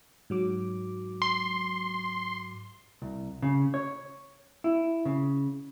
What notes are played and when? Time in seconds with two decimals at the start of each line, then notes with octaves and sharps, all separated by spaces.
0.30 G#2 F#3 D6
1.22 C6
3.02 C2
3.42 C#3
3.74 C#5
4.64 E4
5.05 C#3